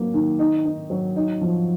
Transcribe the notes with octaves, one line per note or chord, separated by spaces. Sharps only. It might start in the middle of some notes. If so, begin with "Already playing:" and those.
Already playing: F#3 A#3
D#3
D#4
D#4
F#3
D#4
F3